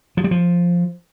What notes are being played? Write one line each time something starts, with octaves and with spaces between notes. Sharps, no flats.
F3
G3
F3